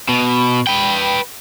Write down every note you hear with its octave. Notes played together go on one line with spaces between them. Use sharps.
B2
B4 G5